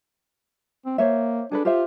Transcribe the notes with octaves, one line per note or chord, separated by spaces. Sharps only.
C4
A#3 C5 C#5 E5
D4 G#4 A4 B4
F4 G4 C5 E5